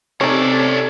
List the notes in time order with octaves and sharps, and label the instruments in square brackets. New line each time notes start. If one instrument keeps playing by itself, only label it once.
[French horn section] C3 [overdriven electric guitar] C#4 D5 [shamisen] D#4 C#5 [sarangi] A4